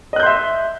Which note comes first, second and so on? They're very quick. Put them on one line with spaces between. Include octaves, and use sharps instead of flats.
D#5 F#6 G6 C6 E5